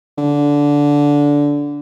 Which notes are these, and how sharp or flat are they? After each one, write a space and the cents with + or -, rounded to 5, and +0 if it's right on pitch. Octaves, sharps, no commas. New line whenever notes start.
D3 -15